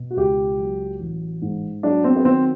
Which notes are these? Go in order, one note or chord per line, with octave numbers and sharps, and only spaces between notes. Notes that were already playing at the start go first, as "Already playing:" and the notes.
Already playing: B2
F#4
C#2 G4
F#3
A1
G#2
F#3 D4
C4
B3
D#3 C4